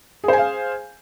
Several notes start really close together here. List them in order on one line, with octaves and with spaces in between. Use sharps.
G#4 C5 G#5 F5